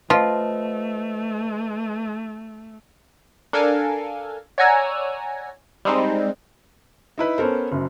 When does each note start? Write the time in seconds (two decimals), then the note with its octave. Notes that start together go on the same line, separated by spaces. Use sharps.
0.10 F3 A3 F4 B4 D#5
3.53 D4 A4 A#4 F5 G#5
4.58 C#5 D5 F#5 G#5 A#5 E6
5.85 G3 G#3 C4 D#4
7.18 D#4 E4 B4
7.38 B3 C#4 A4 A#4 C5
7.72 F#1 F#2